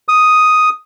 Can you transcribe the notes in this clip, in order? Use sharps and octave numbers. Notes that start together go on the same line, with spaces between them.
D#6